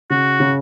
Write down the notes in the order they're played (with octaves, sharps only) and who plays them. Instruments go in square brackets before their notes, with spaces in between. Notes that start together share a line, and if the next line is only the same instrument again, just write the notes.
[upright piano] C#3 [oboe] F#4
[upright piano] C#3